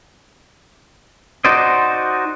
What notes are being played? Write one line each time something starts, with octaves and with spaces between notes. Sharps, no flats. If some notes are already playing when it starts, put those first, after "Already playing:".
D#4 F#4 C5 D5 D#5